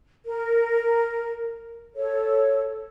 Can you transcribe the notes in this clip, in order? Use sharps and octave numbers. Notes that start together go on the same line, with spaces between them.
A#4
A4 C#5